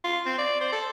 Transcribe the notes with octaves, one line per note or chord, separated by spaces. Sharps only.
F4
C4
D5
C5
A4